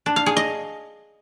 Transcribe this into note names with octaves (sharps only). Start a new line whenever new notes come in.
D4
F5
G#4
D#5